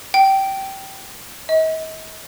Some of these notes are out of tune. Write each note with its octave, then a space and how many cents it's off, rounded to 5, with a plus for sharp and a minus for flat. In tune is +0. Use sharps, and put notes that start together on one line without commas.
G5 -15
D#5 +40